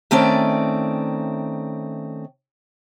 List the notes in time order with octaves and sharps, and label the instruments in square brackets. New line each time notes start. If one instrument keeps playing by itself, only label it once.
[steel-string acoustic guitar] D#3 A3 C4 C#4 D5